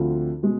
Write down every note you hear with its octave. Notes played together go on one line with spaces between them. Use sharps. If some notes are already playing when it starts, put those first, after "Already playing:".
Already playing: D2 D3 F3 C4 F4
B2 G#3